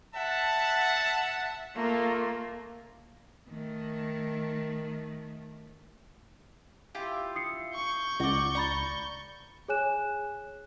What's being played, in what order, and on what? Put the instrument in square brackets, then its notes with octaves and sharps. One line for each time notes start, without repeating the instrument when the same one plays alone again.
[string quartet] E5 [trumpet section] F#5 A5
[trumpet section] A3 F4 [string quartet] A#3
[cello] D#3 A3
[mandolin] E4 F4 G4
[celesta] D#6 C7 C#7
[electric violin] C#6 G6
[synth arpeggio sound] C#2 [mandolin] F#4 D5
[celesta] D5 B5 A6 [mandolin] A#5
[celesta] G#4 C#5 G#5 F#6 E7